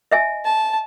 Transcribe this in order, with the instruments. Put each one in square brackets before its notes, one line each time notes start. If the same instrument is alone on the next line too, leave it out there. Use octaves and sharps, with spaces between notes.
[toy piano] D#5 E5 G#5
[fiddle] A5